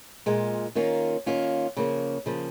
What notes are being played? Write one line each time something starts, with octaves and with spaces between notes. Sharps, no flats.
A#2 G#3 F4
D#3 A#3 C#4 F4
D#3 A#3 C#4 F4
C#3 F3 A#3
C#3 F3 A#3